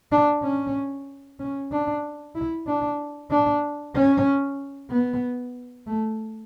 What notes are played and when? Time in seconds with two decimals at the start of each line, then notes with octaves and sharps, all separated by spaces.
0.12 D4
0.43 C#4
1.40 C#4
1.72 D4
2.36 E4
2.67 D4
3.31 D4
3.95 C#4
4.91 B3
5.87 A3